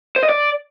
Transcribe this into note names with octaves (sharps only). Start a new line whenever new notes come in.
C5
D#5
D5